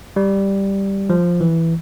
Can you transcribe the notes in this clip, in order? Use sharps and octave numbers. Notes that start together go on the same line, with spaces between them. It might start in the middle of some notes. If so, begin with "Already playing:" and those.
G3
F3
E3